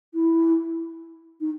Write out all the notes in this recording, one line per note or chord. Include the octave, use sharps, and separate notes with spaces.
E4
D#4